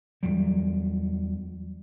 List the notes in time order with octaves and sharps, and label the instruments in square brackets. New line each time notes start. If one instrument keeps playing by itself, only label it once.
[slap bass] E2 F#3 G3